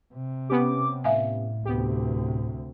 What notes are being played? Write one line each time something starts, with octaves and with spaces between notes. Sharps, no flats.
C3
B3 C#4 G4 D6
A2 E5 F5 G#5
D2 C3 B3 G4